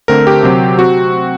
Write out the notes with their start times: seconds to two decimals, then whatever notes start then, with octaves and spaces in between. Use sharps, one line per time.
0.08 D3 A3 C4 A#4
0.27 G4
0.43 C3 F#3 C4
0.79 C4 F#4